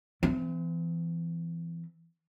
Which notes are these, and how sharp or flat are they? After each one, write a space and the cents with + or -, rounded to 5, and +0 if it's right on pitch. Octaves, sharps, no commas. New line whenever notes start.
E3 +25 C4 -40